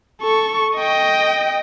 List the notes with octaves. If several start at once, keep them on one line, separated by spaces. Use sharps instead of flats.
A4 C#6
D#5 G5